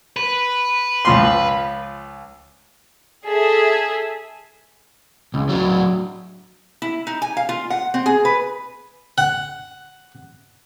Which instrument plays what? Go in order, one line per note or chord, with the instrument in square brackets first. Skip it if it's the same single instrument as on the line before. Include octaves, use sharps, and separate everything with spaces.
[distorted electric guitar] B4
[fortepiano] C#2 F3 C6
[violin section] G#4 A4 E5
[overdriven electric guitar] C#2
F#3 D4
[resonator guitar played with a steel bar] E4
D#4
G#5
F5
F4
F#5
C4
G#4
B4
[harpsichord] F#5